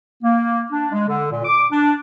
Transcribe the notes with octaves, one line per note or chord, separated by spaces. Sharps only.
A#3
D4
G#3
D3
A#2
D6
D4